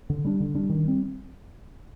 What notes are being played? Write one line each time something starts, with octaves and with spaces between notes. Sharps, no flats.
D3
G3 D4
D3
G3 D4
D#3
G3 C4